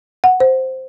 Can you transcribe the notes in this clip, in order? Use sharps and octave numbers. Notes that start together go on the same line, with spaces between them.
F#5
C5